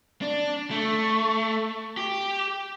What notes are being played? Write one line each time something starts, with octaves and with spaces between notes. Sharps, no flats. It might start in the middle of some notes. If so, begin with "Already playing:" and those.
D4
A3
G4